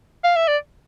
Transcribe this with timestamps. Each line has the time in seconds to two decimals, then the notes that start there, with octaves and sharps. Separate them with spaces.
0.24 F5
0.36 E5
0.48 D5